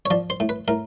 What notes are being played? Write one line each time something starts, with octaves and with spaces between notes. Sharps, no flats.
C#5
F3 D5
C5
A2
B4
A2 A#4